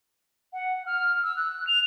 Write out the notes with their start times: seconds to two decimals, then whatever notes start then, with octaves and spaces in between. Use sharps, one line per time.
0.53 F#5
0.86 F6
1.23 E6
1.37 F#6
1.67 F7